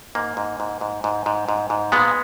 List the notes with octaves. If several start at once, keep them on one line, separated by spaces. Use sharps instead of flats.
G#2 A#3
G#2
G#2
G#2
G#2
G#2
G#2
G#2
A#2 G#3 B3